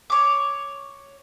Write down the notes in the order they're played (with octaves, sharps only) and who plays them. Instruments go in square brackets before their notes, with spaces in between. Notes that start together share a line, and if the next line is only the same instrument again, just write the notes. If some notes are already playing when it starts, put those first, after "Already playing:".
[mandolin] C#5 D6